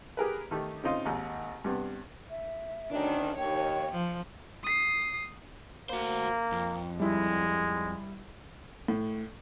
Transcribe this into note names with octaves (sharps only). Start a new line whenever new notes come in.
G4 G#4 A#4 B4
D#3 A3 D#4 G4
C#3 C4 D#4 F4
G#1 D#2
G2 C3 B3
E5
D2 D#3 C#4 D4
D#2 C#5 G5
F3
D#6 C7
A#3 F#4 C5
F2
G3 G#3 E4
A2